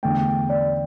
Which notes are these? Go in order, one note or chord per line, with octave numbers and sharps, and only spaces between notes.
E2 D3 A3 G5
D5